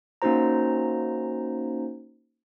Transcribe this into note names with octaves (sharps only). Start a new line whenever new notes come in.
A#3 C#4 D#4 F#4 C5 A#5